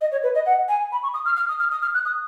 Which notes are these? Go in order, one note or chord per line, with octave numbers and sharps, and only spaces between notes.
D#5
C#5
B4
D#5
F#5
G#5
B5
C#6
D#6
F6
F6
D#6
F6
D#6
F6
F#6
D#6